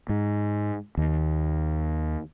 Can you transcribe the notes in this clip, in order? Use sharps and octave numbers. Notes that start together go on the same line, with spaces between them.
G#2
D#2